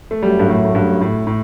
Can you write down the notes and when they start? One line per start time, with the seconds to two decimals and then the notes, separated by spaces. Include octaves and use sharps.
0.11 A3
0.23 F#2 F#3 G3 A3
0.39 G2
0.49 A2
0.65 A2
0.75 G2
1.01 A2
1.27 A2